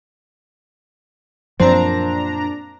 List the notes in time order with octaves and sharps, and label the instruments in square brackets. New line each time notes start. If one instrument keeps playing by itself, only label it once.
[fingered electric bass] F#2 F3 F#3 [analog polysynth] A#2 D4 A#5 [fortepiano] C4